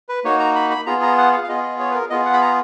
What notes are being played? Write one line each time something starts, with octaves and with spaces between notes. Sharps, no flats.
B4
A#3 D#4 F#4 C#5
A#5
B5
B5
B3 F4 G#4 A#5
A#5
F#5
F5
F5
B3 F4 G#4 D#5
D#5
C#5
B4
A#4
B3 F4 G#4 D#5
F#5
B5
A#5